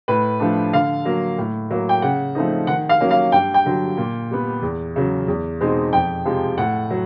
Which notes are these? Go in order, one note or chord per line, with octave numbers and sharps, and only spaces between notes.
A2 B4
F3 A3 D4
D3 F5
F#3 A#3
A2
F#3 A#3
G5
C#3 F#5
F3 A3 C4 D#4
D#3 F#5
F5
F#3 A#3 C#4
F5
G2 G5
G5
D3 F#3
A#2
G3 B3
E2
C#3 F#3
E2
B2 G#3 C4 D#4
F2 G5
C3 F3 G#3
A2 F#5
F#3